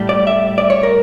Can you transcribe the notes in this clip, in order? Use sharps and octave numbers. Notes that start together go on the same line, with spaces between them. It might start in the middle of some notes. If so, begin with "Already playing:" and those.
Already playing: A2 G3
D5
E5
D5
C#5
A#4